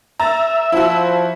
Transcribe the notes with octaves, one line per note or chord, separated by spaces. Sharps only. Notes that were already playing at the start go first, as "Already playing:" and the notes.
E5 A#5 A6
F3 E4 F#4